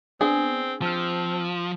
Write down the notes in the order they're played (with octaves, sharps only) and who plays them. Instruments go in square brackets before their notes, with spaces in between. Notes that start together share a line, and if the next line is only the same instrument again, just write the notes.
[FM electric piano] B3 D4 [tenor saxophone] C4 [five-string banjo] G#4
[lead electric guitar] F3 [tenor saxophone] C4 [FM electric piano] A5 F6